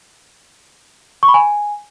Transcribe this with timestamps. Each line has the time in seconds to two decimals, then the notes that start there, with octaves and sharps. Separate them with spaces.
1.23 C#6
1.28 B5
1.34 G#5